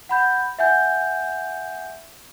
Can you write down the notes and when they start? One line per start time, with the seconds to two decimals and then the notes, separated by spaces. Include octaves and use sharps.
0.09 F#5 B5 G6
0.59 E5 F#5 G#5 G6